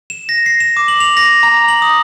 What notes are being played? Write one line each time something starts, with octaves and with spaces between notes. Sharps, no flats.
E7
A#6
C7
E7
D6
F#7
F7
A#6
A#5
F#7
D#6